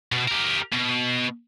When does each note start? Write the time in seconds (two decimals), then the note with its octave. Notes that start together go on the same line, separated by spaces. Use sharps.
0.12 B2
0.28 G4 A#4
0.73 B2